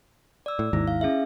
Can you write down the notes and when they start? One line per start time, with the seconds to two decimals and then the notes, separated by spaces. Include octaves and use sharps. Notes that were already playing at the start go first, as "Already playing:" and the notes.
0.46 D5 E6
0.59 A2
0.73 G#1 D#2 G#2 E4
0.88 F5
1.01 C#4 G#4 E5